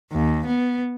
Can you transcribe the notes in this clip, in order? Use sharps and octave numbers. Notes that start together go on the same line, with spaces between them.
D#2
B3